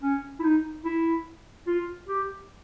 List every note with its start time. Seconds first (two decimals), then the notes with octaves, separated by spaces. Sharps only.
0.02 C#4
0.40 E4
0.43 D#4
0.85 E4
1.67 F4
2.08 G4